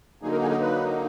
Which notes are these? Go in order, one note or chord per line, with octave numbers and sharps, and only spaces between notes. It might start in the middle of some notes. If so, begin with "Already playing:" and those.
D3 F#3 A#3 D#4 G#4
A#4
G#4
A#4
B4